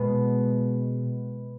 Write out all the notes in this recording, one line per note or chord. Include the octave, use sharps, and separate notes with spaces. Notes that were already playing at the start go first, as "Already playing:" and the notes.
Already playing: B2 G#3 B3